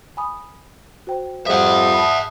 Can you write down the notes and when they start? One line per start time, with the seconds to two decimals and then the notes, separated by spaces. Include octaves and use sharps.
0.17 G#5 B5 D#6
1.07 F#4 C5 G5
1.47 F2 G#2 G3 G#4 E5 F#5 D#6
1.93 A5 B5